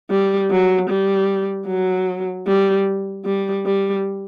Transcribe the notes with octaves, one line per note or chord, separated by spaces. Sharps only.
G3
F#3
G3
F#3
G3
G3
G3